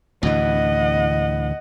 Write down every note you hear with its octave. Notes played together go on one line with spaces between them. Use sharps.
D2 A2 E3 D#5 F#5